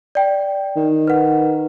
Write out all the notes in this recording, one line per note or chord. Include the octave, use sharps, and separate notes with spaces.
D5 G5
D#3
B4 F#5